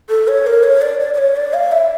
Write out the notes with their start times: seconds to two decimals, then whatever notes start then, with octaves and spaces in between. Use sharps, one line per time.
0.10 A4
0.28 C#5
0.47 A#4
0.63 C#5
0.82 D5
1.00 D5
1.14 D5
1.18 C#5
1.36 D5
1.54 F5
1.72 E5